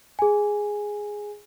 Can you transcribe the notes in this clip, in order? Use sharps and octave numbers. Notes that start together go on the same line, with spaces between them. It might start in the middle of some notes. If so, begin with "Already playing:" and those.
G#4 G#5